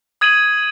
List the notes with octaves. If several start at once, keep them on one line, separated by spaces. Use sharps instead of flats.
D#6 G#6 D#7 F#7